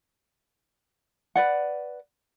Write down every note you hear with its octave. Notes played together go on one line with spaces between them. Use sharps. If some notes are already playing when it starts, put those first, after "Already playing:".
B4 D5 F#5